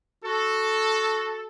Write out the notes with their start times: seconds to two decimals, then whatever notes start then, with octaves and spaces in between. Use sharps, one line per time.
0.24 F#4 A4